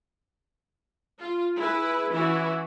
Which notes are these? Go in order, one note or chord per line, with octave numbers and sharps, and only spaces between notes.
F4
E4 G#4 B4
E3 C#4 E4 F#4